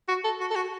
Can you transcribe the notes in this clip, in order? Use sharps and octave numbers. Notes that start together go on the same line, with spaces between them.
F#4
A4
F#4
A4
F#4